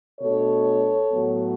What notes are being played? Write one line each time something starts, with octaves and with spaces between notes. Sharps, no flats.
B2 A3 D4 A4 C#5
A2 F#3 B3